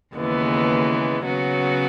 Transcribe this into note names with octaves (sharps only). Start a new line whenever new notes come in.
D#2 C#3 E3 G#3 B3
C#3 F#3 B3 F#4